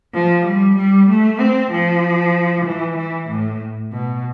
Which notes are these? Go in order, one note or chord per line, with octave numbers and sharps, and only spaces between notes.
F3
G3
G3
A3
C4
F3
E3
E3
A2
B2